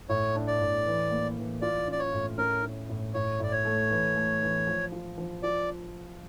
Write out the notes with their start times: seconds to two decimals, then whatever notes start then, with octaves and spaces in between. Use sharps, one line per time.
0.09 A2 C#5
0.35 D4
0.48 D5
0.61 A2
0.86 E3
1.11 A#3
1.37 E3
1.62 F4 D5
1.87 C#4 D5
1.99 C#5
2.13 A2
2.38 C#4 A#4
2.63 C#4
2.89 A2
3.14 A2 C#5
3.40 A2 D5
3.52 C#5
3.65 A3
3.90 E3
4.16 A3
4.42 E3
4.67 F3
4.92 F4
5.18 F3
5.43 F4 D5